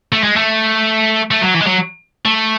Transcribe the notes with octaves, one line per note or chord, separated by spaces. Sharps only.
A3
G#3
A3
A3
F#3
E3
G#3
F#3
A3